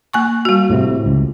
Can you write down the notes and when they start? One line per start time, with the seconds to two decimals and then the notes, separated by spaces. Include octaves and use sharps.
0.13 A#3 G#5 C#6
0.45 G3 F#4
0.70 A2 C3
1.06 C#2